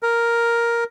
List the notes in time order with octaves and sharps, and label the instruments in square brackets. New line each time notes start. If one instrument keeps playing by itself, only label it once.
[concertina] A#4